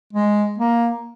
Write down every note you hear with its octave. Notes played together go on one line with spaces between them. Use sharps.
G#3
A#3